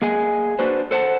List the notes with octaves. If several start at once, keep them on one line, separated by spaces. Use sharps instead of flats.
A#3 G#4 D#5 G#5
D4 F#4 B4 C5
A4 C5 F#5 G#5 A5